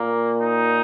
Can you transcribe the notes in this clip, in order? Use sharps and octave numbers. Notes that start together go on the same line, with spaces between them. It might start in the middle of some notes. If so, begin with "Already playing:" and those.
Already playing: A#2 A#3
D#4